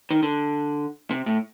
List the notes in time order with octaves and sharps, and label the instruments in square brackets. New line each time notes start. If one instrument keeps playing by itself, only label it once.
[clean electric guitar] D#3
D3
C3
A2